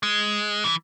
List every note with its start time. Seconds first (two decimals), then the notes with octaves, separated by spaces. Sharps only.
0.03 G#3
0.64 E3